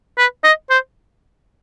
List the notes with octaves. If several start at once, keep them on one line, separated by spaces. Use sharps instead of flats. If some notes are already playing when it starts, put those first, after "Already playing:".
B4
D#5
C5